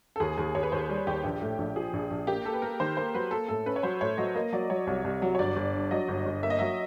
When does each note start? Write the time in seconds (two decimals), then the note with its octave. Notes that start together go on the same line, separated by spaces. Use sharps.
0.16 A4
0.20 D#2 G#4
0.38 D#2 G#4
0.55 D#2 C#5
0.63 B4
0.72 D#2 C5
0.89 G3
1.07 D#2 G4
1.23 A#1 G4
1.42 A2
1.58 A#1
1.76 F3 G#4
1.93 A#1
2.11 A#1
2.27 A#3 G4
2.45 A#3 A4
2.54 B4
2.62 A#3 A#4
2.80 D#3 C5
2.97 A#3 C5
3.14 F#3 B4
3.31 A#3 A4
3.48 A2 A4
3.66 C#4 B4
3.76 C#5
3.83 F#3 C5
4.01 A2 C#5
4.18 F#3 D#5
4.35 A#3 D#5
4.53 F#3 D5
4.70 F#3 C#5
4.87 C2 C#5
5.04 C2
5.22 F#3
5.35 C#5
5.39 G1 D5
5.56 G1
5.74 G2
5.91 F#3 D#5
6.08 G1
6.26 G1
6.43 A#3 E5
6.50 D#5
6.59 F#3 E5